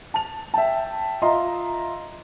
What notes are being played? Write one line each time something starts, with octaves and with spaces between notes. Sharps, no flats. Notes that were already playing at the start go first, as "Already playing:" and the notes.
A5 F7
E5 G5 A5
F4 D#5 E5 A#5 C6